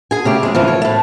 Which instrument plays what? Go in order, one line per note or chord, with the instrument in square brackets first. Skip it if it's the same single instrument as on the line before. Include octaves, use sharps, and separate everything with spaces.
[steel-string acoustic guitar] G#4 G#5
C#3 A3 G4
F2 G#3
G#2 C#3 E3 F3
C#5
A2 A3